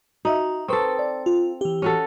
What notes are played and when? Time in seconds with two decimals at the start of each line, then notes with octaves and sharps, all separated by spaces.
0.25 D#4 F#4 D#5 E5
0.68 C4 A4 B4 C#6 D#6
0.99 D5
1.26 F4
1.61 E3 G4
1.82 C#4 F#4 A4